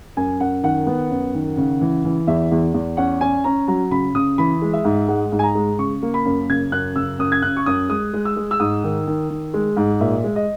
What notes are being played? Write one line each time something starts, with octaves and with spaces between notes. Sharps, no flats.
F#2 G#5
F#2 F#5
D#3 F#5
B3
F#2
D#3
C#3
E3
E3
E2 E5
E2
E2
C#4 F#5
C#4 G#5
C#4 A#5
F#3 A#5
C#3 B5
C#3 D#6
E3 B5
G#3
E5
G#2
G#3 F#5
G#2
G#5
A#5
G#3
C#3 C#6
A#3
B5
F#2
C#3 G#6
F#2 F#6
C#3 E6
F#2 D#6
G#6
C#3 F#6
C#6
F#2 D#6
G#3 D#6
G#3
E6
G#3
E6
G#2 D#6
D#3
D#3
D#3
G#3
G#2
A#2 E5
G#3
D#5